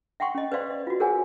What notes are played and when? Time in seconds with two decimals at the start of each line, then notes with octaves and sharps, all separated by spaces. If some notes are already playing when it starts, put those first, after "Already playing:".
0.20 E5 F#5 G5 C6 C#6
0.35 C#4 D#5
0.52 B4 C5 D5 F5 C6
0.71 D#5
0.87 F4 F#4
1.00 G#4 A#4 C5 C#5 F#5 G#5